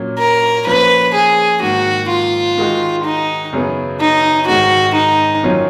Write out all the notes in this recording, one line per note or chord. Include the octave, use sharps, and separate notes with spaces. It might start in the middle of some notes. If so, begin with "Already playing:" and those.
Already playing: A#2 F#3 C#4
A#4
F3 A#3 C#4 B4
G#4
G#2 D#3 A#3 F#4
F4
D#3 G#3 D#4 F#4
D#4
F#2 C#3 F#3 B3
D#4
G#2 D#3 G#3 F#4
D#4
F#2 D#3 F#3 C#4 F4